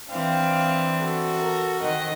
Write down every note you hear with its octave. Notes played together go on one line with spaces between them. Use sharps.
E3 C4 D4 F5 G5
F#4 A4
A#4
D#3 C4 D#5 F#5